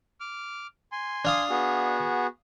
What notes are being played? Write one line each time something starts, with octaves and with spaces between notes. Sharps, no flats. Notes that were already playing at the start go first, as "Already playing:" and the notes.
D6 F6
G#5 C6
D4 F5 D#6
B3 F#4 G#4